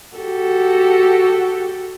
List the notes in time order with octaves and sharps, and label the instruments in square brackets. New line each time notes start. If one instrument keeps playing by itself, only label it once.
[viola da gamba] F#4 G4 A4